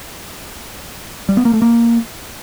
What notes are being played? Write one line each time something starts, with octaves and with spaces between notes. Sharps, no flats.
G3
B3
A#3
A3
A#3